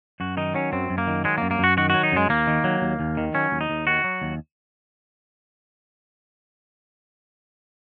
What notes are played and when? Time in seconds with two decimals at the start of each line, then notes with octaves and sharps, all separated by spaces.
0.20 F#2 F#4
0.37 D#3 D#4
0.54 F#3 C#4
0.73 F#2 C4
0.90 F#2
0.98 A#3
1.07 D#3
1.24 F#3 G#3
1.38 A#3
1.42 F#2
1.51 A#3
1.59 F#2 F#4
1.77 D#3 F#4
1.90 F#3 F#4
2.03 D#4
2.12 F#2 G#3
2.29 D#2 A#3
2.47 D#3
2.64 F#3
2.82 D#2
3.00 D#2
3.17 D#3
3.34 F#3 C#4
3.52 D#2
3.61 D#4
3.70 D#2
3.87 D#3 F#4
4.04 F#3
4.22 D#2